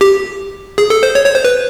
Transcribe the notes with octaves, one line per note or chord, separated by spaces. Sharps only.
G4
G#4
A4
C5
C#5
C#5
C5
B4